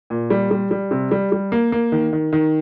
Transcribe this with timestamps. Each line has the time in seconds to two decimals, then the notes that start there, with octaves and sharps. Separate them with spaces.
0.10 A#2
0.30 G3
0.51 G3
0.71 G3
0.91 C3
1.11 G3
1.32 G3
1.52 A#3
1.72 A#3
1.92 D#3
2.13 D#3
2.33 D#3